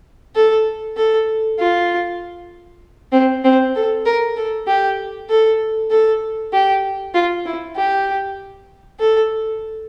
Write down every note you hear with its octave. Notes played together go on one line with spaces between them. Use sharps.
A4
A4
F4
C4
C4
A4
A#4
A4
G4
A4
A4
G4
F4
E4
G4
A4